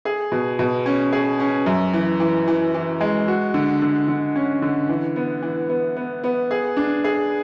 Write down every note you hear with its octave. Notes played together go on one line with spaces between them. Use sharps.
G#4
B2
B2
C#4
G#4
C#4
F#2
E3
E3
E3
E3
G#3
F#4
D3
D3
D3
C#4
D3
E3
B3
E3
B3
B3
B3
G#4
D4
G#4